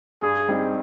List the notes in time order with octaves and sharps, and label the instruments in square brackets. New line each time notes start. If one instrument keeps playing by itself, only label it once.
[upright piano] G2 [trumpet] G#4
[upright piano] G3 C4 D#4